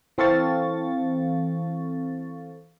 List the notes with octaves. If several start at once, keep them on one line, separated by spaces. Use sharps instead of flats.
E3 C4 A4 F5 C#6 A6